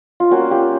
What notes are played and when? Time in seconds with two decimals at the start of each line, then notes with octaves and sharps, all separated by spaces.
0.20 F4
0.30 G3 A#3 C#4 F4 F#4
0.51 F4 G4